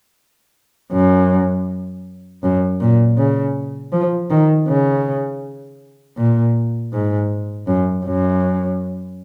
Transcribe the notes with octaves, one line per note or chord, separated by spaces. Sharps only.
F#2
F#2
A#2
C#3
F3
D#3
C#3
A#2
G#2
F#2
F#2